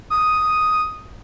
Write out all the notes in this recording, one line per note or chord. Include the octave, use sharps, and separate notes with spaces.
D#6